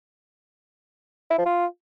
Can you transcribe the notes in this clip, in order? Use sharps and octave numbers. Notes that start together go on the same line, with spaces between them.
E4
F3
F4